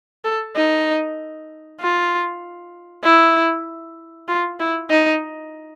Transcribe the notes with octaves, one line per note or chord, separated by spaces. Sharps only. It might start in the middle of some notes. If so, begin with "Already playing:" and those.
A4
D#4
F4
E4
F4
E4
D#4